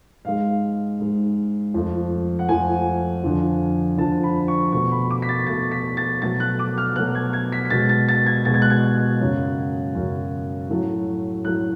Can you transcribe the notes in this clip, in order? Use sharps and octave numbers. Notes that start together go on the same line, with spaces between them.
G#2 G#3 F5
G#2 G#3
F2 F3 A3
F#5
F2 F3 A3 G#5
F2 D3 F3
F2 D3 F3 A5
B5
C#6
B2 A3 C#6
B5
D6
B6
A6
B2 A3 A6
B6
A6
B2 F#3 A3 A6
F#6
D6
F6
B2 F#3 A3 F#6
G#6
G#6
B6
B6
B2 G#3 A6
A6
A6
G#6
B2 G#3 A6
G#6
F#6
G#6
F#2 C#3 F#3
F#2 C#3 F#3
A2 F#3 A3
A2 F#3 A3 F#6